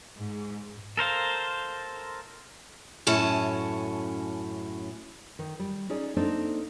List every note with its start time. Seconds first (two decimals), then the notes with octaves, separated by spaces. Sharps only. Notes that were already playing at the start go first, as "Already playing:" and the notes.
0.18 G#2
0.97 A4 A#4 C5 F5
3.07 F#2 A2 C#4 A5
5.39 D#3
5.59 G3
5.90 C#4 D#4 G#4 D5
6.17 A#3 C4 D4 D#4 A4